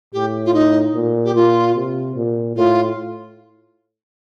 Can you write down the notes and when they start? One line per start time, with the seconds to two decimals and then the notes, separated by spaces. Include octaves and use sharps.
0.13 A2 G4
0.45 F4
0.54 D#4
0.94 A#2
1.25 G4
1.34 A#2 F4
1.75 C3
2.16 A#2
2.56 A2 F4